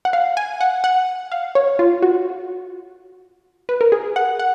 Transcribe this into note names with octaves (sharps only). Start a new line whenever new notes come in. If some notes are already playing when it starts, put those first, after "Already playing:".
F#5
F5
G#5
F#5
F#5
F5
C#5
F4
F#4
B4
A#4
G#4
F#5
F#5